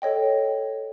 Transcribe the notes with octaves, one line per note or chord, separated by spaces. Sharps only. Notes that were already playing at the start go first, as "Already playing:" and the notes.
A4 C#5 D#5 G5